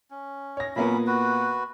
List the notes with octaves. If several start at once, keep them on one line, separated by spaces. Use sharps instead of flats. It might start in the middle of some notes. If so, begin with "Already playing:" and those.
C#4
C#5 A#6
A#2 F#3 A#3 B3 C#4 B5
F#4 B4